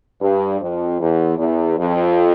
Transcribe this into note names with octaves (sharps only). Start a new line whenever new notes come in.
G2
F2
E2
E2
F2